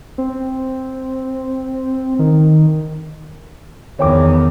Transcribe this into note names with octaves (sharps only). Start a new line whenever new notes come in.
C4
D#3
E2 D#3 C#5 G5 D6